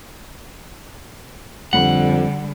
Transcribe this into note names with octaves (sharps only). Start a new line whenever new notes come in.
F2 D3 G3 F#5